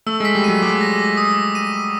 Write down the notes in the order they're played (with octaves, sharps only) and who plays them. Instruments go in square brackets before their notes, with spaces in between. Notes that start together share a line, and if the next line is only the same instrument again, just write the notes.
[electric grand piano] A3 [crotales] E6
[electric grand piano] G#3 [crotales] B6
[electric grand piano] G3
[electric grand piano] F#3 [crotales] D#7
[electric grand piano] G#3 [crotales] D6
[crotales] A#6
D6
D#6
A#6
D#7
D6